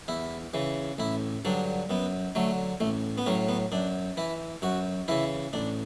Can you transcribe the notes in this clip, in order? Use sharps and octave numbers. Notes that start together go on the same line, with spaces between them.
E2 E4
C#3 E3
A1 E4
G2 D3 F#3 D4
F#2 B3
D3 F#3 A3
A1 A3
B3
A2 F#3 C#4
B3
F#2 D4
E3 E4
F#2 F#4
C#3 E3 E4
A1 D4